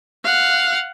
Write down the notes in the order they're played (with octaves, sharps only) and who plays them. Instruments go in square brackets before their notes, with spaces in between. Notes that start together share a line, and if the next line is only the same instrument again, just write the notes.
[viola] F5 F#5